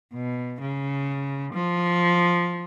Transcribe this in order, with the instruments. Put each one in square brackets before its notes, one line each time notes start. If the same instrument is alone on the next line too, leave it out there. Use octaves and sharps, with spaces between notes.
[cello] B2
C#3
F3